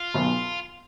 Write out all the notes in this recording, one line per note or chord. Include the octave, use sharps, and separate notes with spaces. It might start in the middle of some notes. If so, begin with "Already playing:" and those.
Already playing: F4
B1 B2